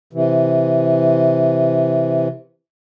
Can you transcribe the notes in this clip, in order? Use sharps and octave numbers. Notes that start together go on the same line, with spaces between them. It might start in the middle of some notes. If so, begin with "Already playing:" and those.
C3 E3